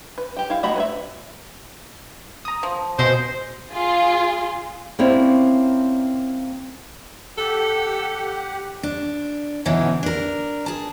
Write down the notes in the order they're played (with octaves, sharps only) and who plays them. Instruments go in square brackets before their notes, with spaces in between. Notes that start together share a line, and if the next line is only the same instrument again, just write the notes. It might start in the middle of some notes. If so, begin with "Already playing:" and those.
[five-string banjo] B4
G4 G5
E4 F5
A3 F#4 D#5 A#5 B5
B4 C#5 E5
[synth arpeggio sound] A#5 D#6
[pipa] F3
[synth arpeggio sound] B2 [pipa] G#3 D#5 [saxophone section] C5
[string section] F4 G#4
[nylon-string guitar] A#3 C4 C#4 E4 C#5 D5
[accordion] G4 F#5 [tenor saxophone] A4
[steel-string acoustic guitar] D4
B2 D3 E3 C#4 D#4
D4 A#4
G#4 A5